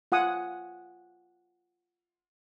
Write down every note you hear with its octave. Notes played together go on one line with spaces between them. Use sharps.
F4 F#5 G#5 D#6